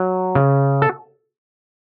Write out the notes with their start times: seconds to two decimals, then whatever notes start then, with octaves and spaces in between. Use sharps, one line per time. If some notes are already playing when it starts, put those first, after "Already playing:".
Already playing: F#3
0.35 C#3
0.82 A4